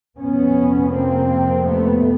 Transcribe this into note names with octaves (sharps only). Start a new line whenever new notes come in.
F2 C3 B3 C#4
A#3 C4
A3 B3